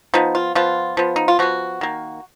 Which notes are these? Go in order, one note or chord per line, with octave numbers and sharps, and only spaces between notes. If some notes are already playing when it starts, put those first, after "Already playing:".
F3 B3 D#4
F4
F3 B3 F4
F3 B3
D#4
F4
F3 B3 F#4
D#3 A#3